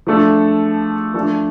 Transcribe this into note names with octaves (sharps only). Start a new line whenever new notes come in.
F3 A3 D4 A4
F3 A3 D4 A4